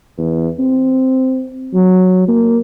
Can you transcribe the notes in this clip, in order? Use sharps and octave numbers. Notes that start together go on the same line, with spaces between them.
E2
C4
F#3
A#3